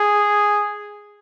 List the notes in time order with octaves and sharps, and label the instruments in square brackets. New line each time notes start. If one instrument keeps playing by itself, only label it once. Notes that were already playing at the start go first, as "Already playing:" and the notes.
Already playing: [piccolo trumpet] G#4